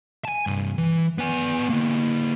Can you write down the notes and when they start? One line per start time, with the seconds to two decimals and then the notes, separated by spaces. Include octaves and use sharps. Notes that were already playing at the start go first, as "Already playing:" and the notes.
0.25 G#5 A5
0.47 C2 G2
0.78 E3
1.18 B3 G#5
1.70 D3 A#3